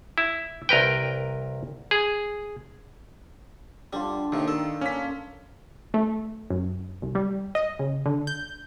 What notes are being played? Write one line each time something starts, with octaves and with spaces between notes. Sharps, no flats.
E4
C2 A#4 B4 G5
G#4
D3 G3 D4 F4
D#2 C3 D#3 A#4
A4
A#3 C#4 A5 B6
A3
F#2
C2
G3
D#5
C#3
D3
G6